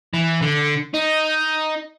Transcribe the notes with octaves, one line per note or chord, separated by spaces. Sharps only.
E3
D3
D#4